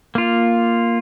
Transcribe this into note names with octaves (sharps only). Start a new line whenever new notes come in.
A#3 F4